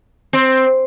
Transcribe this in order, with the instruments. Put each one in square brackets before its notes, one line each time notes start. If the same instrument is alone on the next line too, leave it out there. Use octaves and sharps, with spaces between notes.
[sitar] C4